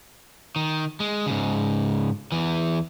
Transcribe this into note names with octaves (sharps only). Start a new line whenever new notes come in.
D#3
G#3
G#2 C#3
E2 E3